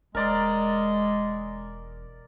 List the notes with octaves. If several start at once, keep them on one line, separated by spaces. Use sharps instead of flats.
E1 G#3 A#4 D5